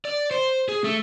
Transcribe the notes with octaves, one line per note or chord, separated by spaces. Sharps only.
D5
C5
G#4
A3